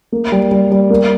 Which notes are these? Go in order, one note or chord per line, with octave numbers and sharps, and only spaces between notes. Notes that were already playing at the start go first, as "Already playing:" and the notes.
A#3
G3
G3
G3
A#3